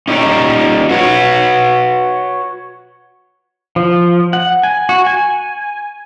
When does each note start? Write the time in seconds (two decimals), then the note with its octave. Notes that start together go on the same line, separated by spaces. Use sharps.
0.08 C#4 D#4 G4 A#4 C#5
0.90 F#4 B4 C#5
3.76 F3
4.33 F#5
4.63 G#5
4.89 F#4
5.06 G#5